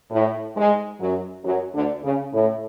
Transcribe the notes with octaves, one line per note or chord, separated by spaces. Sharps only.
A2
G#2 G#3
F#2 F#3
F#2 F#3
D2 D3
C#3
A2